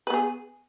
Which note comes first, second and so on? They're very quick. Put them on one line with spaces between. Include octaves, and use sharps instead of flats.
B4 B3 G#4